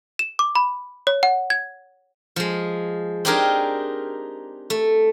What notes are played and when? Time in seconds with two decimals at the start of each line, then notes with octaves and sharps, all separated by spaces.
0.19 E7
0.39 D6
0.55 B5
1.07 C#5
1.23 F#5
1.50 G#6
2.36 F3 G#3
3.25 C4 D4 D#4 G4 G#4 A#4
4.70 A3